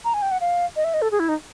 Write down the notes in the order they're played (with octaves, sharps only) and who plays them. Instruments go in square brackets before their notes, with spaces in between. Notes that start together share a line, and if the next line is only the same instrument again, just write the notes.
[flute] A#5
G#5
G5
F#5
F5
D#5
E5
D#5
A4
G#4
E4
D#4